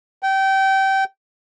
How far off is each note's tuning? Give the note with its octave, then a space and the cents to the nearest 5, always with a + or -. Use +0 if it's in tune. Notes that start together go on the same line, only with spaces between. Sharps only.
G5 -25